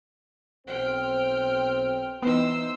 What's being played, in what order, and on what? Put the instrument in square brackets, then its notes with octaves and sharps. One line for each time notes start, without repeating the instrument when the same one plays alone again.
[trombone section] B1 C4 C5 [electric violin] G5 F6
[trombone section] E3 D#4 [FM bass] B3 [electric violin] C5 E6